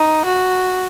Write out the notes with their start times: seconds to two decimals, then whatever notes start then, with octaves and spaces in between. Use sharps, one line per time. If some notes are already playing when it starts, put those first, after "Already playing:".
Already playing: D#4
0.25 F#4